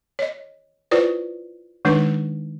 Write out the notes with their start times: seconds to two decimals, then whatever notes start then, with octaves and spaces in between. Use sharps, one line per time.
0.19 C#5 D#5
0.91 E4 F4 B4 C5 D5
1.85 D#3 G#3 D4 D#4 B4